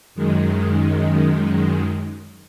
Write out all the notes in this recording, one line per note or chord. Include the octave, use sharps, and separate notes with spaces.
F#2 D#3 G#3